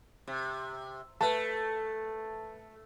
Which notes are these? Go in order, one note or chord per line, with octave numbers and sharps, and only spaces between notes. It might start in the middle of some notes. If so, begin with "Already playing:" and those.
C3
A3 B4 A5